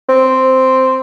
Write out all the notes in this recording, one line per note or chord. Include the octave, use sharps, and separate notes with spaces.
C4